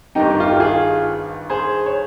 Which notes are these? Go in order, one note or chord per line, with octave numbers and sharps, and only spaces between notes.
G#1 G2 D#3 D#4 G4
F4
G4
F4 G#4
G#4 C5
C#5